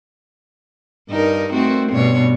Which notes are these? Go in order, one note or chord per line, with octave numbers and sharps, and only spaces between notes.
G2 D#4 A#4
A3 C4 F#4
G2 B2 C#5